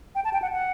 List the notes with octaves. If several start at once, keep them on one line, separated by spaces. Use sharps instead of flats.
G5
A5
G5
F#5
F#5